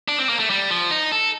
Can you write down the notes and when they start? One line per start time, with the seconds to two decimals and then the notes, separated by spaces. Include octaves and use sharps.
0.08 D4
0.19 C4
0.29 A#3
0.39 A3
0.50 G3
0.71 F3
0.91 D#4
1.12 A4